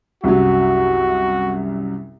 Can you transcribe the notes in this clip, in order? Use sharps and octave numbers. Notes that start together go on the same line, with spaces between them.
C2 F#2 F#3 F#4